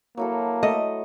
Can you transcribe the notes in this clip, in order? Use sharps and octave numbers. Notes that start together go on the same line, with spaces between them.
F#3 A#3 E4 A4
A3 D#5